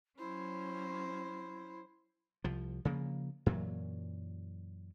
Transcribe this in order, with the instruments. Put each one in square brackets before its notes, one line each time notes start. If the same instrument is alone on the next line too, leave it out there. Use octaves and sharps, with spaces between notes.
[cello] F#3 C#4 [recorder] E4 [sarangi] C5
[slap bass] C2 F3
C#3 F3 A#3
F#2 A#2 E3 F#3